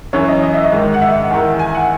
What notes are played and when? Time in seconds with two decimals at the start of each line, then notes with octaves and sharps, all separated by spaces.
0.13 F#2 E3 C#5
0.28 D#5
0.43 D#5
0.54 E5
0.64 D#5
0.72 G#2 D#3
0.94 F#5
1.02 E5
1.31 E2 D#3
1.59 G#5
1.75 F#5